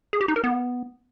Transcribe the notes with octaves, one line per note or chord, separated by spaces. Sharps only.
G#4
G4
D#4
A#4
B3